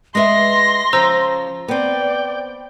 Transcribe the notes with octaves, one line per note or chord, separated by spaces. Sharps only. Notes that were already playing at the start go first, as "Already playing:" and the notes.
G#3 B4 E5 C6 A#6
C#3 F3 C5 A#5 E6
B3 C4 D5 G5